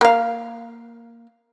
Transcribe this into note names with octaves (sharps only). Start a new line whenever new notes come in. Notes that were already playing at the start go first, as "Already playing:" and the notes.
A#3 F5